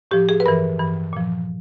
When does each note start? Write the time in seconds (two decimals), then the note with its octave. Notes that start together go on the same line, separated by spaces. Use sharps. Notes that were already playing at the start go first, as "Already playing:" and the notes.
0.11 A2 F3 G4
0.29 G#4
0.40 B4
0.46 G2 E3 A#4
0.79 G2 E3
1.13 A#2 F3